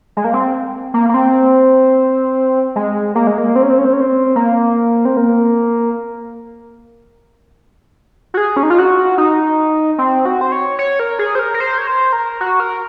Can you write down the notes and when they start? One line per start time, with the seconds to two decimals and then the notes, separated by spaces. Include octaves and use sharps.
0.17 G#3
0.24 A#3
0.34 C4
0.94 A#3
1.09 A#3
1.14 C4
2.76 G#3
3.15 A#3
3.27 G#3
3.38 A#3
3.56 C4
3.63 C#4
3.70 C4
3.78 C#4
3.85 C4
3.93 C#4
4.01 C4
4.36 A#3
5.05 C4
5.17 A#3
8.34 F#4
8.37 G#4
8.57 C#4
8.63 D#4
8.70 F4
8.78 F#4
9.18 D#4
9.98 C4
10.26 F#4
10.41 C5
10.52 C#5
10.79 C#5
11.00 A#4
11.19 G#4
11.35 C5
11.39 A#4
11.54 A#4
11.60 C5
11.78 C#5
11.87 C5
12.13 A#4
12.41 F#4
12.60 A#4